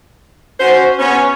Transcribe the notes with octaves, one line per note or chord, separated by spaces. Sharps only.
C#4 F#4 C5
B3 C#4